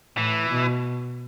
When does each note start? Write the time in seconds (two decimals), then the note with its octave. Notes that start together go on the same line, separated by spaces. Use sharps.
0.17 A2 E3
0.49 B2